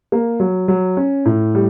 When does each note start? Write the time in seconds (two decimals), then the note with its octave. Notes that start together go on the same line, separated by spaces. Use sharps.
0.12 A#3
0.40 F#3
0.68 F#3
0.97 C#4
1.25 A2
1.55 G3